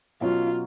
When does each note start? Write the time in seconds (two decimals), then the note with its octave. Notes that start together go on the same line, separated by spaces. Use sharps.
0.21 B2 F#3 C#4 F4